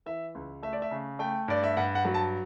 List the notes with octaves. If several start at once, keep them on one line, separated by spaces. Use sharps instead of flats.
E3 E5
C#2
A3 E5
D5
E5
C#3
A3 G5
G2 D5
E5
G2 F#5
F#5
F#3
A5